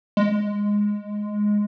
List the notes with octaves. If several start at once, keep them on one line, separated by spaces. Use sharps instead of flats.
G#3